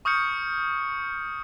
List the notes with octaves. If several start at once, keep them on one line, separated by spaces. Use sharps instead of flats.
C#6 D#6 F6 G6 C#7